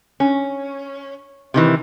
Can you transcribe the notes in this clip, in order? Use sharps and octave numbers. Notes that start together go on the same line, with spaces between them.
C#4
C3 D#3 E3